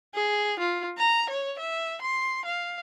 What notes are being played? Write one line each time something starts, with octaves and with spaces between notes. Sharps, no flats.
G#4
F4
A#5
C#5
E5
C6
F5